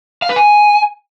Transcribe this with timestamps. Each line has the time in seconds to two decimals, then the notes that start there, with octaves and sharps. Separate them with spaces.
0.22 F5
0.29 B4
0.36 G#5